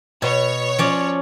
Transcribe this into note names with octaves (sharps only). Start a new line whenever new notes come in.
B2 C#5
F3 C#4 D5